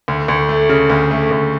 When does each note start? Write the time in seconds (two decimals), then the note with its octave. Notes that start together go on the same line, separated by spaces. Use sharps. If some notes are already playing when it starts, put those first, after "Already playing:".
0.08 D2
0.28 D2
0.49 A3
0.69 C#3
0.90 D2
1.11 A3
1.31 D2